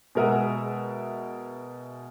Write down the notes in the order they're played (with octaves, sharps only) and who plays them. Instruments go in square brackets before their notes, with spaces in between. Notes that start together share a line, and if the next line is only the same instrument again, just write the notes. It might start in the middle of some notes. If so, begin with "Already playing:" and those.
[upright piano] B2 G#3 A#4 E5 F#5 D#6